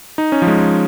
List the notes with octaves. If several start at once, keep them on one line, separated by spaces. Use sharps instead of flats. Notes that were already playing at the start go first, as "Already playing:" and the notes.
D#4
C#4
F3
G#3